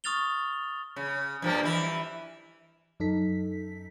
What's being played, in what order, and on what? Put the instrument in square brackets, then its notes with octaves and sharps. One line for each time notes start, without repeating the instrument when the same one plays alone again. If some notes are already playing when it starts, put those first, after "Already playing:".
[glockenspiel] C#6 D#6 F6 A6 F7 G7
[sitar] C#3
G2 F3 A#3
E3 E4
[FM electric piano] F#2 D#4 A4 B6